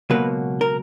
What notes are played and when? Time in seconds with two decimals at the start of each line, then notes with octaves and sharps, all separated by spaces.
0.10 C#2 B2 F#3 A#3 B4
0.61 A#4